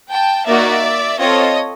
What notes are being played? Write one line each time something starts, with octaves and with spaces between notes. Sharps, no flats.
G5 A5
A#3 D#4 F#4 D5 E5
C4 F4 A4 C#5 D#5